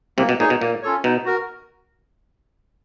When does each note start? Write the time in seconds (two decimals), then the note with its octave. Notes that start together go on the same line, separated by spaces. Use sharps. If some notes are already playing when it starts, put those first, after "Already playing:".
0.18 C2 C3 A#3
0.29 B2
0.40 A#2 D#4 G#4 C#5
0.50 B2
0.61 A#2 A#3
0.82 C#4 F4 A4 C#5
1.04 B2 D#4
1.25 F#4 A#4